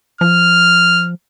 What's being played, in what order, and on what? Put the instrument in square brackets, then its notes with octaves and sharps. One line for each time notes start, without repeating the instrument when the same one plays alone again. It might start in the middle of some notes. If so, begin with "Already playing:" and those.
[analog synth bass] F3 [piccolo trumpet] F6